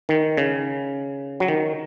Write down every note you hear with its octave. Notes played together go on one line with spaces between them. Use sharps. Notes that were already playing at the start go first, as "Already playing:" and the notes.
D#3
C#3
F#3
D#3